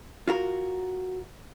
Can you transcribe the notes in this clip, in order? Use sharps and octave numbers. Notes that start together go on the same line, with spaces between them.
F4 F#4 A#4